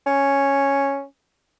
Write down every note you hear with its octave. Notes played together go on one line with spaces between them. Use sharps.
C#4